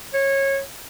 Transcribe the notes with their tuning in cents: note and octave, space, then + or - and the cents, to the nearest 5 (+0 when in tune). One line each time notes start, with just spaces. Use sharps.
C#5 -20